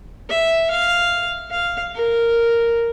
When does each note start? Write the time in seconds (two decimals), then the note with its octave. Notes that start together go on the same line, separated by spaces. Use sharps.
0.29 E5
0.70 F5
1.51 F5
1.95 A#4